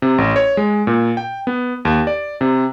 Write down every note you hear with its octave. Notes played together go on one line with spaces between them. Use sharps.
C3
A1
C#5
G#3
A#2
G5
B3
D#2
D5
C3